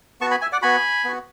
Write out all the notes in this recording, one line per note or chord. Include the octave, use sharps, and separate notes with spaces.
B3 F#4 A5 C#6
G#5 B5
E5 G#5
D5 F#5
B3 F#4 G#5 B5
B3 F#4